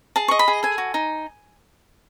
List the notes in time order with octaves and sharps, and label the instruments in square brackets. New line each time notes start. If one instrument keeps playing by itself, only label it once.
[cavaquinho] G#4 A5
D#5 C#6
B5
G#4
A4 G#5
F#4
D#4